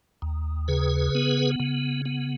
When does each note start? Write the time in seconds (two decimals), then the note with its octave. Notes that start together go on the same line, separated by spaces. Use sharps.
0.22 D#2
0.68 C#3 G#4 B4
1.15 B3
1.60 C#3
2.05 B3